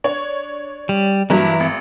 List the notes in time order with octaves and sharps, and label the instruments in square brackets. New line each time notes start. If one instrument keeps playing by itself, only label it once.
[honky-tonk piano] D4 C#5
[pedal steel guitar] G3
[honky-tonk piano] G2 F#3 A#3 [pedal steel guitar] E3 E4
[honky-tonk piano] G#1